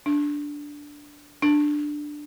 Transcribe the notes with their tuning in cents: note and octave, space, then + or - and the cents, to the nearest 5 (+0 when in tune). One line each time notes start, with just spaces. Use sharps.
D4 -5
D4 +10